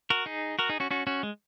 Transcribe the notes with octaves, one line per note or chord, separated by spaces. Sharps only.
F#4 A#4
D#4 G#4
F#4 A#4
D#4 G#4
C#4 F#4
C#4 F#4
C#4 F#4
G#3